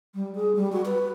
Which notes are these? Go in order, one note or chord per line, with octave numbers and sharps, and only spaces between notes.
G3
G#4
G3
F#4
B4